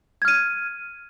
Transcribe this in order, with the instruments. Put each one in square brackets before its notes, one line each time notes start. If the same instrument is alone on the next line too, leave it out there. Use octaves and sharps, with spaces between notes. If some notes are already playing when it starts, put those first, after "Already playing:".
[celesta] G#6
F6
D#7